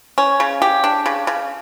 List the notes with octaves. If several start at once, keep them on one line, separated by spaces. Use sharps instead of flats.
C#4
C#3
G4
D4
C#3
C#3